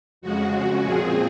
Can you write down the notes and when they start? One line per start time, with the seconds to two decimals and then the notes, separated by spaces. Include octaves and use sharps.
0.22 F2 C#3 G#3 F#4
0.84 A#2 F3 C4 G#4